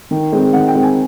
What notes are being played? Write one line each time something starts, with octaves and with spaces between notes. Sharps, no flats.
D#3
G#3 C4
D#3 F#5
G5
G#3 C4
G#5